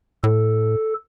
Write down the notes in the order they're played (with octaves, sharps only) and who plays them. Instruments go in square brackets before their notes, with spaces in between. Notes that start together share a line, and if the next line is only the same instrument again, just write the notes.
[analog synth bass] A2 [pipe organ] A4